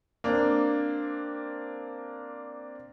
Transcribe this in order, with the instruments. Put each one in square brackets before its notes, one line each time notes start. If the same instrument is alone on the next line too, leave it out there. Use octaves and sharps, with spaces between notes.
[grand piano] A#3 C4 D4